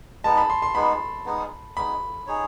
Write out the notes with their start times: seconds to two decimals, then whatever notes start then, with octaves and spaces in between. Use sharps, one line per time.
0.24 G#3 B3 D#4 A5
0.37 B5
0.50 C6
0.62 C6
0.75 G#3 B3 D#4 B5
1.26 G#3 B3 D#4
1.77 G#3 B3 D#4 B5
2.27 D#4 G#4 C#5